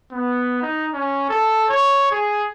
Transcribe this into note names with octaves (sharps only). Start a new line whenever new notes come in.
B3
D#4
C#4
A4
C#5
G#4